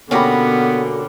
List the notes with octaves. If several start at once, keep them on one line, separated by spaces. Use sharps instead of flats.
B2 D3 A#3 B3 C#4 F#4 G4 B5